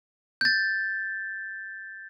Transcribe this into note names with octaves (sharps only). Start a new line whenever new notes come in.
G6 A6